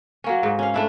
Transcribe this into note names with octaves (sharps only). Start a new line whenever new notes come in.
F#3 A#3 C#4
G#2
C#4 F5
A3 D4 E4